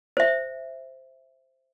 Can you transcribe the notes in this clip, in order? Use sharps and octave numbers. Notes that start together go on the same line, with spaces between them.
C5 E5